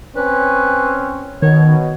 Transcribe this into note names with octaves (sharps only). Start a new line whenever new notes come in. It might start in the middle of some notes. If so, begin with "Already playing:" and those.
C4 C#4 B4
B2 D#3 C#5